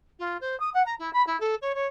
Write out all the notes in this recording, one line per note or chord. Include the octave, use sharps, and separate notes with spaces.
F4
C5
D#6
F#5
A#5
E4
B5
E4
A4
C#5
C#5